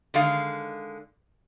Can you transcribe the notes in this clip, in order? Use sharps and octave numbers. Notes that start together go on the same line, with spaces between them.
D3 D#3 G#3 F5